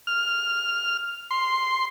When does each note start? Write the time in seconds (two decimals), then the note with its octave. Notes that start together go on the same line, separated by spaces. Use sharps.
0.07 F6
1.31 C6